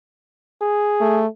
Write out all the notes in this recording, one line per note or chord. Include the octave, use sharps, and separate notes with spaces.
G#4
A3